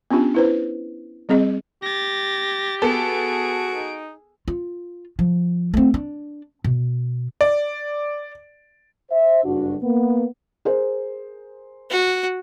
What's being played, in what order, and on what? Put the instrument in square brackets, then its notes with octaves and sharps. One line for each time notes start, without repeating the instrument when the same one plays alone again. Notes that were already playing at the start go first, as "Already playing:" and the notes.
[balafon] B3 C#4 D4 F4 G4
E4 B4 C5
G3 C4 G#4 D#5
[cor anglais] G4 [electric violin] A6 A#6
[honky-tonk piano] B3 A4 [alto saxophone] F#4 [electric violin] G#4 D7
[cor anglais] D#4
[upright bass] F4
F3
A3 C4
D4
B2
[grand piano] D5
[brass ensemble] C5 E5
F#1 G2 D4 F#4
A#3 B3
[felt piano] G#4 A#4 C5
[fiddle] F#4